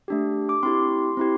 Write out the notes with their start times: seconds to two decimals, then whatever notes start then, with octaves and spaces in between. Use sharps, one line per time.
0.08 A3 D4 G4
0.49 D6
0.63 C4 E4 G4 C6
1.17 C4 E4 G4